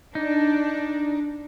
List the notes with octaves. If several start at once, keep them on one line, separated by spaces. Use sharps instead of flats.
D4 D#4